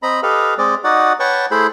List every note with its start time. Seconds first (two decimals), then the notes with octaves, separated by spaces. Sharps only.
0.03 C4 D#5 A#5 B5
0.23 G4 A4 B4 D#5 F5
0.58 G#3 C4 D5 D#5
0.84 D#4 F#4 D5 F#5
1.20 B4 C#5 F#5 G5 A5 C#6
1.51 A3 E4 G#4 C5 B5